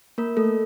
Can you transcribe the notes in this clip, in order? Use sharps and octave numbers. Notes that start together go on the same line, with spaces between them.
A#3 A#4
A3 A4